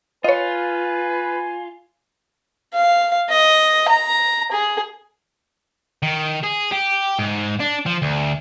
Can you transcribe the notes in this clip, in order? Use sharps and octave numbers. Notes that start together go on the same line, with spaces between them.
F4 B4 C#5 D#5 G#5
F5
D#5
A#5
G#4
D#3
G#4
G4
G#2
D4
F3
D2